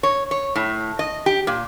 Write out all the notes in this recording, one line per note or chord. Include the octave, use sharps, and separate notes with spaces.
C#5
C#5
A2
D#5
G4
A#2